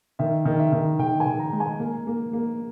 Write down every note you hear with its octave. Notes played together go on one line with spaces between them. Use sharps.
D#3 E5
D#3
E5
D#3
D#3 G5
G#5
D#3
A#5
G#3
G#5
A#3
A#3
A#3